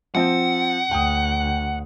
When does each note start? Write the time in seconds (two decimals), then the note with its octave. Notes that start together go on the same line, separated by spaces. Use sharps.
0.15 F3 C4 F#5
0.91 D2 G5 D#6